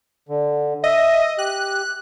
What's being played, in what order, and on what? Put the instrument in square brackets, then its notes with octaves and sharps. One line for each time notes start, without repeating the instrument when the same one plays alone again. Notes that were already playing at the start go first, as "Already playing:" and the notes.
[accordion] D3
[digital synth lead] D#5 [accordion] E5
[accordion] G4 [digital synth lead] F#6